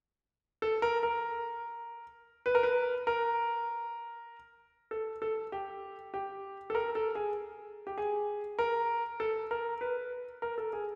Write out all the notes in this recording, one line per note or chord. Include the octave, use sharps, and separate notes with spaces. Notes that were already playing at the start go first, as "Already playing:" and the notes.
A4
A#4
A#4
B4
A#4
B4
A#4
A4
A4
G4
G4
A4
A#4
A4
G#4
G4
G#4
A#4
A4
A#4
B4
A#4
A4
G#4